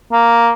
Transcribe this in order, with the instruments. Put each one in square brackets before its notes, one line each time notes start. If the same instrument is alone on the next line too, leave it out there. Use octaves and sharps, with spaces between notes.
[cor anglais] A#3